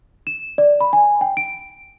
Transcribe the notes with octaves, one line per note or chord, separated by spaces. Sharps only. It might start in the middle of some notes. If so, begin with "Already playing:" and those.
E7
D5
B5
G#5
G5
D7